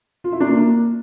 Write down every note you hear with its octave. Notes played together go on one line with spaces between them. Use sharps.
F4
E4
D4
A#3